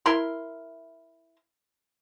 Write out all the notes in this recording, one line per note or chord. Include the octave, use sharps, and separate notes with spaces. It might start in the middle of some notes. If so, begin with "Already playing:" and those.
E4 A#4 C6